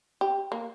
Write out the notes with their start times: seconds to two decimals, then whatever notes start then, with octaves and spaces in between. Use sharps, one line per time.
0.21 G4
0.52 A#3